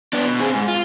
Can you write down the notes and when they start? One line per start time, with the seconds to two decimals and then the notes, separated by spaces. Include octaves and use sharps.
0.13 B3 D4
0.26 B2
0.40 C4 G#4
0.55 G#2
0.68 F4